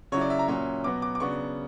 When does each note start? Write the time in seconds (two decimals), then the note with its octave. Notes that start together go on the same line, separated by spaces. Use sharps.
0.12 C#3 F#3 C#4 E4 C#5
0.21 D5
0.30 E5
0.39 A#5
0.48 A#2 F#3 C#4 E5
0.84 B2 F#3 B3 D6
1.02 D6
1.15 D6
1.20 C#3 F#3 B3 D4 C#6